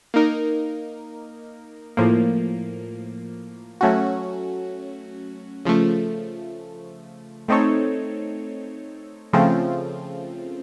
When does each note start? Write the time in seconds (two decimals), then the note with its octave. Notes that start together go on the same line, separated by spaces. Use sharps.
0.14 A#3 D#4 A#4
1.97 A2 F3 A#3
3.81 F#3 A3 C#4 F#4
5.65 C#3 F3 A3
7.48 A3 C4 D#4 A4 C#5
9.33 C#3 F3 A3 C4 F4